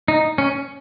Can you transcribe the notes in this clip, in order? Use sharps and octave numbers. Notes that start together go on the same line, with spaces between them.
D#4
C#4